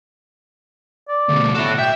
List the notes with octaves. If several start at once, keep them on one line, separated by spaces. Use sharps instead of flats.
D5
D2 B2
E4 F#4 A4
E5 G5